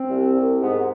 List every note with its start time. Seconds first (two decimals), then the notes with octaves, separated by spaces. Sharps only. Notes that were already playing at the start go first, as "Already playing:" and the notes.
Already playing: C4
0.08 C2
0.34 C2
0.60 G#2 B3